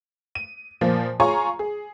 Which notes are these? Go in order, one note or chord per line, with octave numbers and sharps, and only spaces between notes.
D#7
A#2 F3 A#3
F4 G#4 C#5 G#5 A#5 C#6
G#4